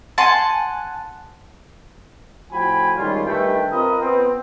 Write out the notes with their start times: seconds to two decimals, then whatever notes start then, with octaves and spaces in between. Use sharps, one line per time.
0.18 F#5 G#5 A5 C6
2.52 A2 F3 F#4 G5 G#5 B5
2.96 D#3 G3 G#3 C#4 F4
3.26 G2 D#3 G3 A3 B4 G5
3.71 C4 F4 A#4 B4 D#5
4.01 B3 C4